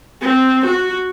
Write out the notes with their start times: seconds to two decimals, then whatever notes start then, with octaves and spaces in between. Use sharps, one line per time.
0.22 C4
0.66 F#4